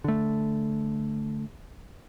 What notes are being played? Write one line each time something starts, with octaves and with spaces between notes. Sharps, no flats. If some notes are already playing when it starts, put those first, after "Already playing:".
D3 A3